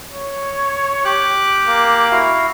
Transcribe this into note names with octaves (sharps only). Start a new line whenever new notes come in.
C#5
G4 D6 F#6
A#3
E4 F#4 F5